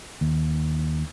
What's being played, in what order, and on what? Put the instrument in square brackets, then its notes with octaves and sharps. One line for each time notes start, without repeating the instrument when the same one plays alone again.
[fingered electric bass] D#2